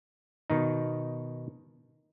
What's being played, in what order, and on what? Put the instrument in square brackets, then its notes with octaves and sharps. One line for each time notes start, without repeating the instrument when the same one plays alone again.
[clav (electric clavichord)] B2 D#3 D#4